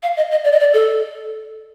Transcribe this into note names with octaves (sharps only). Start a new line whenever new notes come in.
F5
D#5
D#5
D5
D#5
D5
A4